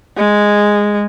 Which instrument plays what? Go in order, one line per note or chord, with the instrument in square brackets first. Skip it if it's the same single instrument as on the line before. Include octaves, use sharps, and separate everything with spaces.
[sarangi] G#3